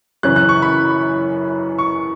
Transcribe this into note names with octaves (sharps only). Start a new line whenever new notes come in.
F#2 C#3 E3 C#4 F#6
F#6
C#6
B5
C#6